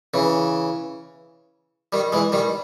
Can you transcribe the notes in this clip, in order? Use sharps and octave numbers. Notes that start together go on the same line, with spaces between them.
C#3 E3
D#3 G3
E3 G#3
D#3 G3